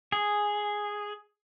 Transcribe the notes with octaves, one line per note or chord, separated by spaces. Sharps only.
G#4